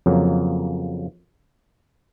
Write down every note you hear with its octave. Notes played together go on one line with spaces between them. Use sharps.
F2 C#3 F#3 A#3